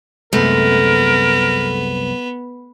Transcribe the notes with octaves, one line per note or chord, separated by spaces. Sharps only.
C2 F#2 G#3 A3 B3 A#4